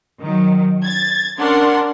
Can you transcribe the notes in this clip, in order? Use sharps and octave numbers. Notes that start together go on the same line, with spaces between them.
D#3 F#3
G#6 A6
C#4 D4 A#4 F#5 C6